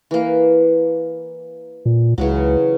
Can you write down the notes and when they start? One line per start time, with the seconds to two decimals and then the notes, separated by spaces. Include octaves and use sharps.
0.11 E3 A#3
1.86 A#2
2.18 C#2 C#3 E3 F#3